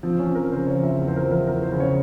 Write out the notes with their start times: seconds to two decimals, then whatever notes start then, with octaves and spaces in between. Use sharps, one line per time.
0.03 F3 C4
0.19 C#4
0.27 F3
0.35 A#4
0.51 C#3 C5
0.68 C#5
0.76 F3
0.83 E5
0.99 E2
1.08 C5
1.16 A#4
1.23 F3
1.31 A#4
1.47 E2 A#4
1.63 C5
1.72 C#3
1.80 C#5